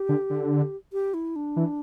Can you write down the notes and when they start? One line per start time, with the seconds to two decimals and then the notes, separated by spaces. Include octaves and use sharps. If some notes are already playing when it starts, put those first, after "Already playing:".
Already playing: G4
0.09 D3
0.30 D3
0.93 G4
1.14 E4
1.36 D4
1.56 E3